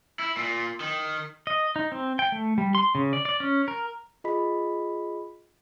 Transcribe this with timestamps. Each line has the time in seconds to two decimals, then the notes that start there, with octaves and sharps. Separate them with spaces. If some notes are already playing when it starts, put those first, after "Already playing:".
0.19 E4
0.37 A#2
0.80 D#3
1.47 D#5
1.76 D#4
1.92 C4
2.19 G5
2.32 A3
2.58 G3
2.75 C6
2.95 C#3
3.13 D5
3.25 D5
3.40 C#4
3.68 A#4
4.24 F4 G#4 D#5 B5 B6